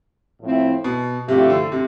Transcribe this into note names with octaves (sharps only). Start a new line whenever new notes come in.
A2 F3 C4 E4
B2
G2 C3 F3 A3 E4 G4
D3
C3